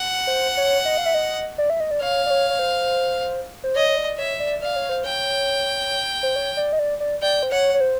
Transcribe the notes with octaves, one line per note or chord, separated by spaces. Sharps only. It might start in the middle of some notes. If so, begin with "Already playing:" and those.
Already playing: F#5
C5
C#5
D#5
F5
E5
D#5
D5
E5
D#5
D5
C#5 F5
D5
C#5
C#5
C5
C5
C#5 D#5
C#5
D5
C#5 E5
D5
D5 F5
C#5
C5
C#5 G5
C5
C#5
D5
D#5
D5
D5
D5 G5
C5
C#5 F#5
C#5
C5